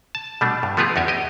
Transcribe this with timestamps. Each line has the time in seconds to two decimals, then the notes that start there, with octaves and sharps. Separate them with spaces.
0.15 A5
0.41 B2 G3 A3 D4
0.63 G2
0.77 F3 A3 B3 F4 G4 G#4
0.96 E2 D#4 G4 G#5
1.08 G4 D#5